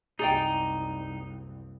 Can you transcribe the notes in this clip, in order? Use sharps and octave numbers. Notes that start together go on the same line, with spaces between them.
F#1 C2 D#4 G#4 D5 G5